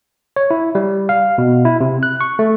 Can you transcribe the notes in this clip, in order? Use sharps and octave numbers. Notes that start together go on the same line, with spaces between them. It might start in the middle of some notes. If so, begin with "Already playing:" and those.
C#5
E4
G3
F5
B2
E4
C3
F#6
C#6
A3